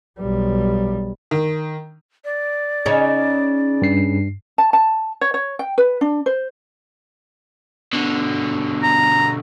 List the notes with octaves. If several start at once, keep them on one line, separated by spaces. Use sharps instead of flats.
B1 G3
D#3
D5
C#3 C#4 D#4
G2 C7
A5
A5
C#5
C#5
G5
B4
D4
C5
B2 D3
A#5